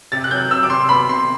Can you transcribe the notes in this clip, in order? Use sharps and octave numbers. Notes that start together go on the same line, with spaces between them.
C3 A6
F#6
F#3 G6
C3 E6
D6
C3 C6
B3 B5
C3 C6